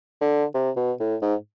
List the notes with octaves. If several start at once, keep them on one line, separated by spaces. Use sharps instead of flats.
D3
C3
B2
A2
G#2